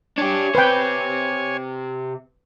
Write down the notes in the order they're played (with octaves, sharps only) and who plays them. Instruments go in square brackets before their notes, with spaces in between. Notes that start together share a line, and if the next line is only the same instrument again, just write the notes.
[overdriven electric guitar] D4 G4 [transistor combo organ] C#5 G#5
[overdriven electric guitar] C3 C5 [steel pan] B4 G5